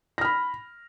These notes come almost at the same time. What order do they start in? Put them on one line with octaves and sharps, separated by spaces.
A#6 F6 B5